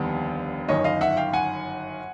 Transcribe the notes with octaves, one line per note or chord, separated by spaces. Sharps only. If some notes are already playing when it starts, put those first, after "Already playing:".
Already playing: F1 D#2 D3 G3 B3
G1 F#2 D#3 C#5 D#5
D#5 F5
E5 F#5
F5 G5
F#5 G#5